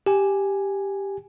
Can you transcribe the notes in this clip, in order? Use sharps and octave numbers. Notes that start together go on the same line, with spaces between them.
G4 G#5